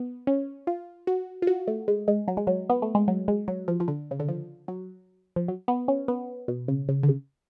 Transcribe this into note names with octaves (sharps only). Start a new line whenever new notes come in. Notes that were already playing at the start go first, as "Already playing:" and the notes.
Already playing: B3
C#4
F4
F#4
F4
F#4
A3
G#3
G#3
F#3
G#3
F#3
B3
A3
G#3
F#3
G#3
F#3
F3
F3
D3
C#3
D3
F3
F#3
F3
F#3
B3
C#4
B3
B2
C#3
C#3
D3
C#3